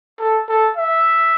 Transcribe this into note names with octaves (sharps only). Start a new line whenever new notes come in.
A4
A4
E5